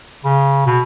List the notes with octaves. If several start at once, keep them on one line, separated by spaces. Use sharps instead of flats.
C#3
B2